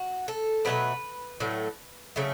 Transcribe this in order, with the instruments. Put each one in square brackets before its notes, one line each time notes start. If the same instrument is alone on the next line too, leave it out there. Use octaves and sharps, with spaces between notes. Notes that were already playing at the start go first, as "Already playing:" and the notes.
Already playing: [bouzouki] F#4
A4
B2 F#3 A3 B4
A2 F#3 A3
C#3 F#3 A3